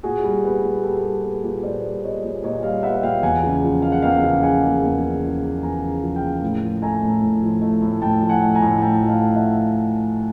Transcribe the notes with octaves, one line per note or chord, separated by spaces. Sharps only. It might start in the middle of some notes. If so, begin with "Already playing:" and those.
A#2 F#4 G#4
G3
B3
A#2
A#2 G4 A4
G3
B3
A#2
A#2 C5 D5
G3
B3 C#5 D#5
A#2
A#2 C#5 D#5
G3 D#5 F5
B3 E5 F#5
A#2 F5 G5
E2 F#5 G#5
C#3
F3
A#3 F5
F#5
E2 F5 G5
C#3
F3 F#5 G#5
A#3
E2
C#3
F3
A#3
E2 G#5 A#5
C#3
F3
F5 G5
A#3
A2
F3
A3 G#5 A#5
A2
A2
F3
A3
A2
A2 G5 A5
F3
F#5 G#5
A3
G#5 A#5
A2
A2 G5 A5
F3
F5 G5
A3
E5 F#5